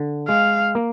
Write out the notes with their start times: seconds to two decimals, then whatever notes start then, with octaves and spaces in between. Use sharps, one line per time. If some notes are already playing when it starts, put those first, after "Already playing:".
Already playing: D3
0.28 G#3 F5
0.75 A#3